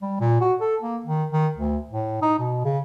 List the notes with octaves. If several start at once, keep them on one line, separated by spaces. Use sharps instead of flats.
G3
A#2
F#4
A4
A#3
D#3
D#3
D2
A2
D#4
B2
C#3